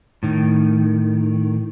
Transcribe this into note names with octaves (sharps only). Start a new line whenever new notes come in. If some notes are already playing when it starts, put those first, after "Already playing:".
A2 D#3